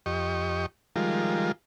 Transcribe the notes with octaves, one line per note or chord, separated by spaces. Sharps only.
F2 G4 D#5 C#6
D#3 F3 G3 G#3 F4 A#4